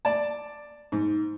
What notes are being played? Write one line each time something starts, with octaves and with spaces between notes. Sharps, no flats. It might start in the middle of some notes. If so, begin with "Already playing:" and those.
D5 A5
G#2